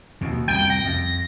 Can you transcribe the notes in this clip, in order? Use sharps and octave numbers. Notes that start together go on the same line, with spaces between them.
D#2 B2
C2 F2 G5
A#6
F2